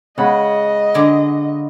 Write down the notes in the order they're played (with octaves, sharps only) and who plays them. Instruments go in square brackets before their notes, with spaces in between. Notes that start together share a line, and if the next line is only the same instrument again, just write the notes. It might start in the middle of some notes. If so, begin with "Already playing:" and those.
[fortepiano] C#3 F#5 B5 [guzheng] G#3 [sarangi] D#5
[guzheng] D3 G#4 D5